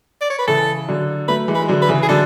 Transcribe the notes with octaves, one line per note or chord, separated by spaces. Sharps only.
D5
C#5
B4
C#3 E3 A4
D3 F#3
F#3 A3 B4
E3 G#3
B4
G#3
D3 F#3
B4
C#3 E3
G#4
D3 F#3 A4